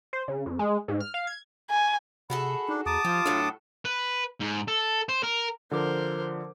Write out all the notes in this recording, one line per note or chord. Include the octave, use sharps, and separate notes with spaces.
C5
C#3
F2
G#3
G#2
F6
F5
G#6
G#5
C3 F#4 G#4 A4 B5
D4 D#4
E2 A5 A#5 D6 D#6
F3 F4 G4
A2 F#3 D4 A4
B4
G#2
A4
C5
A#4
D3 F3 A#4 C5 D6